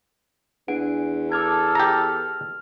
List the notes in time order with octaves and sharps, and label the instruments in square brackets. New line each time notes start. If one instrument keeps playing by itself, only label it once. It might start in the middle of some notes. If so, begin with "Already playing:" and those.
[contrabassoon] E2 [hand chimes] D4 F#5 D7
[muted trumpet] A4 [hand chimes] D6 F6 G#6
[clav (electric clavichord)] G4 A#5 [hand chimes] F6